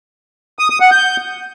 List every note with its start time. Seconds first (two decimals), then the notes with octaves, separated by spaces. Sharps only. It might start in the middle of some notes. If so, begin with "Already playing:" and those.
0.59 D#6
0.70 D#6
0.80 F#5
0.91 G6